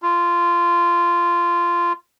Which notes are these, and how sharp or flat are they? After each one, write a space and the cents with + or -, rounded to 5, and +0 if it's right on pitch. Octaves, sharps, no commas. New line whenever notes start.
F4 -15